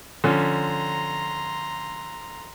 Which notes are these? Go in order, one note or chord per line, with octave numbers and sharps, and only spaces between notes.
D3 F3 C#4 A#5 C6